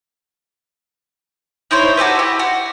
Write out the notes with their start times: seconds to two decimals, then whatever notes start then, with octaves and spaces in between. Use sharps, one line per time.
1.71 D#4 E4 C5 C#5
1.97 F#4 G4 A4 B4
2.19 E4 G4
2.39 F#4